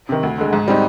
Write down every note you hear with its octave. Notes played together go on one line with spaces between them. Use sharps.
C3 D#3
D2
D3 G#3
G#2
G3 C4 D#4